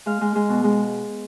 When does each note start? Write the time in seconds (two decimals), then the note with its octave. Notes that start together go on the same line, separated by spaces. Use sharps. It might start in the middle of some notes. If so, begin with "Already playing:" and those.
0.06 G#3 F5
0.21 G#3
0.35 G#3
0.49 B2
0.64 G#3